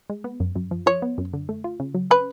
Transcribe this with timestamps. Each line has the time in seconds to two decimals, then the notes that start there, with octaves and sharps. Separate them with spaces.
0.10 G#3
0.24 B3
0.40 F#2
0.56 F#2
0.71 F3
0.86 F3 C#5
1.02 B3
1.18 F#2
1.33 D3
1.49 A3
1.64 F4
1.80 C#3
1.95 F#3
2.11 C#4 B4